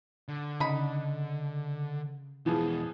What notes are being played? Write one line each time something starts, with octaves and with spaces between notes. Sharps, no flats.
D3
C#3 D#4 B5
E2 B2 E3 F3 G#4